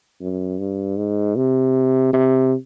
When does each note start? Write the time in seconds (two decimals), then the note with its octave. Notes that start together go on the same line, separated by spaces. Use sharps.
0.21 F#2
0.59 G2
0.97 G#2
1.36 C3
2.13 C3